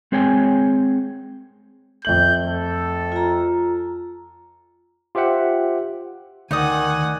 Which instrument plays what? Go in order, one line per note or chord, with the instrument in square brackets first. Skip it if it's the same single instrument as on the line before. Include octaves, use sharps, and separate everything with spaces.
[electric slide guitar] G#3 C4 G#4 C#5 G5 G#5
[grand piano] F2 A3 F#7 [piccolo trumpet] G6
[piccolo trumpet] A4
[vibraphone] F4 A#5
[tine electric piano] F4 G4 C5 E5 F#5 G5
[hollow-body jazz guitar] D2 [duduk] D#3 [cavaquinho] D#4 D5 D#6 [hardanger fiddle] F#5 G#5